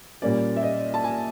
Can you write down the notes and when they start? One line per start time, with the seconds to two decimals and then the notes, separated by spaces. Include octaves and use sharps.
0.22 A#2 G3 A#3 C#4 D5
0.56 E5
0.63 D#5
0.94 A5
1.04 G#5